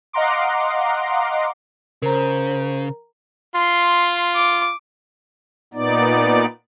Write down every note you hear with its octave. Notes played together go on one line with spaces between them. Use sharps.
D#5 F5 F#5 A#5 C6 D6
C#3 A#4 C5 A#5
F4 C6
D6
A#2 B3 D#4 D5